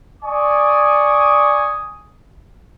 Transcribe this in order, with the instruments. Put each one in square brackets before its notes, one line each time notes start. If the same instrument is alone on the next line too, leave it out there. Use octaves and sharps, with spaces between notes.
[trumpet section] D5 G#5 C#6 D#6